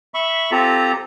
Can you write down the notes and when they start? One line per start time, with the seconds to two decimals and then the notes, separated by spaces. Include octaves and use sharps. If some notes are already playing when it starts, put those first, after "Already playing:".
0.14 E5 B5 C#6
0.51 C4 F4 G4 A4 A#5